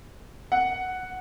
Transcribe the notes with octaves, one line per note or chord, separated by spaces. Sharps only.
F#5